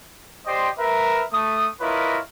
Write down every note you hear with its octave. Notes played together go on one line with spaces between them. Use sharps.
G4 C5 D5 D#5 G5 C6
A#4 B4 E5
A3 D#6
E4 F4 A#4 B4 C#5 D#5